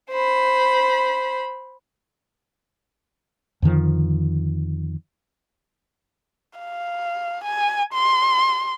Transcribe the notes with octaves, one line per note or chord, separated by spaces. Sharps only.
C5 B5
F2 D3 D#3 F3
F5
G#5
C6